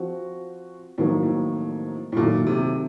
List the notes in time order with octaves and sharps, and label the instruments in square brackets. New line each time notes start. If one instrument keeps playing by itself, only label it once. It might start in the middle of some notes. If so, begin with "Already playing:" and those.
Already playing: [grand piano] F3 C4 F#4
[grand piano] F2 D#3 F#3 A#3 [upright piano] A2
[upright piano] A2
A2
[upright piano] A#2 [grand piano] D#3 F#3 A3
[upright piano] C3